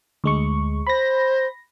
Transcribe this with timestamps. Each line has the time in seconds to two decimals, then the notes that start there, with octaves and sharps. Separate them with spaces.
0.24 D2 G#3 C#6
0.87 C5 B5 A#6